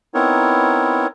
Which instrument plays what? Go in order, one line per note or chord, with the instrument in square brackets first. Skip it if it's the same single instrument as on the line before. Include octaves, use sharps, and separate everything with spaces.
[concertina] B3 C4 D#4 E4 A#4 C#5